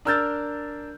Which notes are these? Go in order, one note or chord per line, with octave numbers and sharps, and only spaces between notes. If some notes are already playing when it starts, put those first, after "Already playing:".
D4 A#4 E6 F6 G6 A6